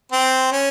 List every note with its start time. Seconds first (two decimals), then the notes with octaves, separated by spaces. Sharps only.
0.12 C4
0.52 C#4